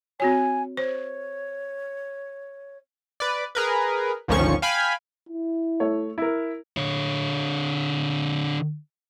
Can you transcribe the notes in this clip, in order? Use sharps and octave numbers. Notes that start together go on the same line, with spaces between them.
C4 F#4 C#5 G#5
C5 C#5
B4 D5
G#4 A#4 B4
G#1 D2 D#3 F3 C#4 C#6
F5 G5 G#5 B5
E4
A3 C#5
E4 A#4
D3 C#5